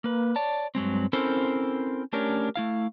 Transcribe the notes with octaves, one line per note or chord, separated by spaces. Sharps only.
A#3 B4
C#5 D5 A5
G2 F#3 G#3 C4
C4 C#4 E4 A4 A#4 C5
A3 C#4 D4 G4 A#4 C#5
A3 E4 F5